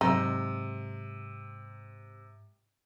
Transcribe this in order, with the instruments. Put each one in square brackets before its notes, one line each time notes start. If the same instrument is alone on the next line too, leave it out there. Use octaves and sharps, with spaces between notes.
[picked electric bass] G#2 [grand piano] C3 [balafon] F#3 [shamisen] D#4